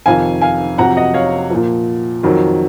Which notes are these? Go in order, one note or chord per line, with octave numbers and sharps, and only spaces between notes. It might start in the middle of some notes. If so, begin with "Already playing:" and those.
F2 C3 D#3 F5 G#5
F5 G#5
F2 C3 F#3 F#5 A#5
D#5 F#5
C#5 F5
A#2 F3
F2 D#3 F#3